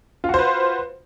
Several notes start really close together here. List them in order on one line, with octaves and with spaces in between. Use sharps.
F4 F#4 C5 B4